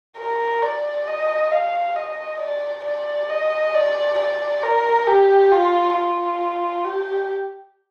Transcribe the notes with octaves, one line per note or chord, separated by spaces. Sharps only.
A#4
D5
D#5
F5
D#5
D5
D5
D#5
D5
D5
A#4
G4
F4
F4
G4